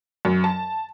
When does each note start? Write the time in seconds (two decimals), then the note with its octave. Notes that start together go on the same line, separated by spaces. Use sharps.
0.25 F#2
0.44 A5